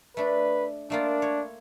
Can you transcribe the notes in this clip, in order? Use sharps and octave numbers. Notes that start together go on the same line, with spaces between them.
A3 D4 B4
A3 A#3 D4 F4
C#5